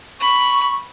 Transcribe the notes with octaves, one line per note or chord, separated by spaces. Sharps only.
B5 C#6